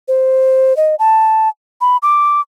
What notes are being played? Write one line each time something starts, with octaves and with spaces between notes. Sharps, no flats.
C5
D#5
A5
B5
D6